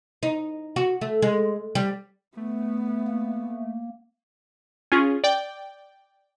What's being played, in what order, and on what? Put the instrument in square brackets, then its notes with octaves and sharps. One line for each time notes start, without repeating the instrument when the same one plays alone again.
[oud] D#4
F#4
A3
G#3
G3
[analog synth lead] A3 [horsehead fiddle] B3
[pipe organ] A#3
[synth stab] C#4 F4 G#4
D5 G5